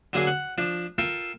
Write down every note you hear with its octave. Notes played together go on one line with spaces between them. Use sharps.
D3 F#3 A#3 G#4
F#5
F3 D4
F4 A4 A#4 G5